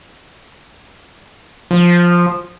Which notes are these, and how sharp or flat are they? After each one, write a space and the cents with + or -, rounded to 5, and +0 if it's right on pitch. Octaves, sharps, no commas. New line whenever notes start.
F3 +5